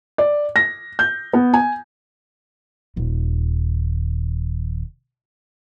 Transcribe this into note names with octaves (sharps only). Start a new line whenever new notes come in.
D5
A#6
G6
B3
G#5
D#1 D#2